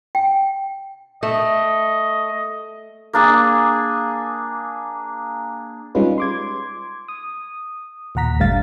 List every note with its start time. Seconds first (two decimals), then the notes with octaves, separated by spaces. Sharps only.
0.15 G5
1.23 A3 D#5
3.13 A#3 D4 G#4
5.95 G3 G#3 C#4 D#4 F4 B4
6.18 C6 D6 G#6
7.08 D#6
8.15 D#2 A#2 F#5 A#5 B6
8.40 G1 D3 G3 A3 F5 A6